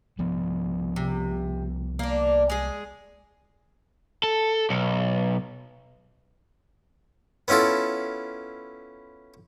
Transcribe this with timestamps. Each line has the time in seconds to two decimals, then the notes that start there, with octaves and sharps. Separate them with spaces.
0.19 C2 F3 B3
0.96 C3
1.99 A#3 D4
2.50 G#3 G#4
4.24 A4
4.70 B1
7.48 B3 C#4 E4 F4 A4